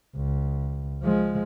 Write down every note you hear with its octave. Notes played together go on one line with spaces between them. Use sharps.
C#2
F3 G#3